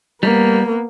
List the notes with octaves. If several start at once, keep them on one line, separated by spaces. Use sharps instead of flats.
G3 A#3 B3